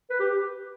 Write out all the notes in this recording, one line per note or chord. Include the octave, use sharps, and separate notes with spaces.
B4
G4